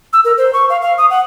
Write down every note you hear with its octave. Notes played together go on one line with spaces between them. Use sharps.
E6
A#4
C5
C#6
F5
F5
D#6
F#5